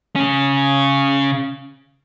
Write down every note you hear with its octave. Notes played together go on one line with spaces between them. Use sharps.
C#3 C#4